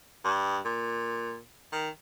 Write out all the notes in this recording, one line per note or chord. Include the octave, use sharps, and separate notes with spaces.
G2
A#2
D#3